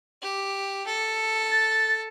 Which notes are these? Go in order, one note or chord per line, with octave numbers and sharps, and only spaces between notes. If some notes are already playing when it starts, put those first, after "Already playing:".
G4
A4
A6